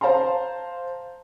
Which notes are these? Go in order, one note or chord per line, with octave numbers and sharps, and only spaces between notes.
C5 F5 A5 A#5 C6